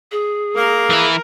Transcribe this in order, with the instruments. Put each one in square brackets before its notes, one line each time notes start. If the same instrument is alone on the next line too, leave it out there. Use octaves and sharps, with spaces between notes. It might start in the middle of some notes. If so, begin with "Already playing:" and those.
[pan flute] G#4
[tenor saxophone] A#3 [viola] A#4
[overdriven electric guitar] E3 E4